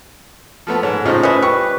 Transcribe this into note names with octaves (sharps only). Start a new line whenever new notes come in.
F3 A3 B3
G#2 C#5
A2 C#3 D#4 F4 C5
C#4 E4 B4 D#5
G3 C#6